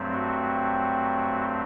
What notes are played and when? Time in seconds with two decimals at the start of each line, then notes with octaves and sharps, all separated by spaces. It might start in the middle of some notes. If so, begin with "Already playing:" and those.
Already playing: G2 F#3 A3 C4
0.13 F#4